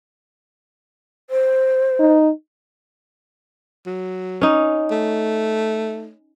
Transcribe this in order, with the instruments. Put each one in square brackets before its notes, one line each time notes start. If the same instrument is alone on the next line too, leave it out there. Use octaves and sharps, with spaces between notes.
[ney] C5
[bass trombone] D#4
[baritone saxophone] F#3
[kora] C#4 D#4
[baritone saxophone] A3